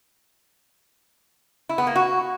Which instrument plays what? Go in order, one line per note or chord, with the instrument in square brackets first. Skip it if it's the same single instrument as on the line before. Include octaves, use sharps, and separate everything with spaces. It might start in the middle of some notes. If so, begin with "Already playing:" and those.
[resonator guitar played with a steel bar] E4
B3
A#3
F#4